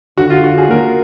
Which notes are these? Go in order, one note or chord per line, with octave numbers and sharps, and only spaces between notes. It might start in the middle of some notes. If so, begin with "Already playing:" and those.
D3 F#4
F4
F#4
G#4
A#3 A#4